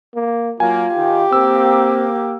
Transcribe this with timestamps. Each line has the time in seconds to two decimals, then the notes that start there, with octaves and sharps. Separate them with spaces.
0.15 A#3
0.60 F#3 A#3 F4 G#5
0.96 D#3 G4
1.33 A#3 C4 E6